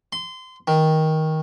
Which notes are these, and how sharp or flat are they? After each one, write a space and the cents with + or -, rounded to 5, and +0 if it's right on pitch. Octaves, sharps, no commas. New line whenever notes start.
C6 -25
D#3 +15